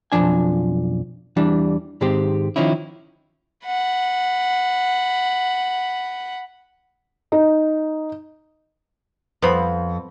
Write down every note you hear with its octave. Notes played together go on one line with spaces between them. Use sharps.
B1 F2 C3 F3 D4 G#5
E2 E3 G3 D4
G#2 D#3 G#3 C4 G4
D#3 F3 C#4 D#4 E4
F#5 B5
D#4
F2 B3 C5 B5